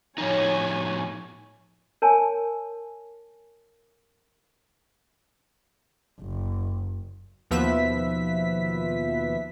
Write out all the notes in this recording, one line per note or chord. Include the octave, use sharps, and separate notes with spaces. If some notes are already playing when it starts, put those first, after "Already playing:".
A2 F3 D#4 C#5 G#5
A#4 C#5 G#5 A5
F#1
D#2 B2 F3 B4 E5 B6